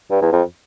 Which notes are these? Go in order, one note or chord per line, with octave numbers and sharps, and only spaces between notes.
G2
E2
F2